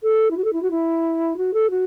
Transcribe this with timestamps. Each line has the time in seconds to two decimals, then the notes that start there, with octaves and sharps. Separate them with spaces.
0.03 A4
0.30 E4
0.37 F#4
0.44 A4
0.52 E4
0.62 F#4
0.70 E4
1.37 F#4
1.53 A4
1.70 F#4